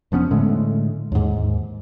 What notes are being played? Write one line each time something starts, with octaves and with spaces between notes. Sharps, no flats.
F1 F3 B3 C#4
A2 D3 G#3 A3
D#2 G#2